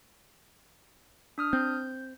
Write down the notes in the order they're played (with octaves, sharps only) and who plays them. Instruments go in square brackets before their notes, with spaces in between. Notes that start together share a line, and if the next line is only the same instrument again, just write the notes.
[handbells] D4 D#6 F6
[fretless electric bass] C4 [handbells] G6